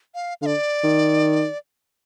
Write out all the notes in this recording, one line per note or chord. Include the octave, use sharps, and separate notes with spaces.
F5
D3 D5 F5
D#3